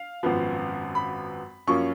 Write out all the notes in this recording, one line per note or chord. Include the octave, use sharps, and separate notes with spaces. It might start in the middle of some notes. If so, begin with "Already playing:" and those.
Already playing: F5
G#1 F#2 F3 B3
B5
F#2 F3 A#3 C#4 C#6